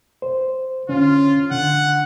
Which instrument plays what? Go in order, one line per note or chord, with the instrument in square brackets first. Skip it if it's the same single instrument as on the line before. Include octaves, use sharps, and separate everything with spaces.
[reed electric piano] C5
[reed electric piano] D3 C#4 [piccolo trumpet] F4
[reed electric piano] D3 [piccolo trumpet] F#5